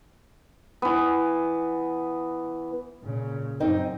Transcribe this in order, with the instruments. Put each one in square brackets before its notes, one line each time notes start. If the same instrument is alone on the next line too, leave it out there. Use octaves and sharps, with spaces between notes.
[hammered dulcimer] E3 B3
[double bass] A#2 C#3
[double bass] F#2 [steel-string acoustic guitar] C4 D#4